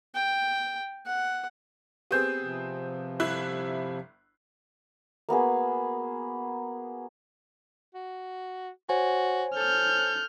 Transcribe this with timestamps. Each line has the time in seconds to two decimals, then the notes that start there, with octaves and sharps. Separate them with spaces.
0.15 G5
1.06 F#5
2.11 B3 C4 G4 G#4 G6
2.42 C3 F3
3.20 G1 E4 F#6
5.29 A#3 B3 F#4 G#4
7.94 F#4
8.89 F#4 C5 C#5 G#5
9.56 A4 F6 G6